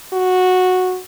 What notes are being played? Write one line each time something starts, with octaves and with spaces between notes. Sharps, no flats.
F#4